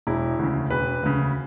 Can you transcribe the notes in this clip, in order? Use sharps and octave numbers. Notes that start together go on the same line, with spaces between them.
E1 E4
D2 C#3
E1 B4
D2 C#3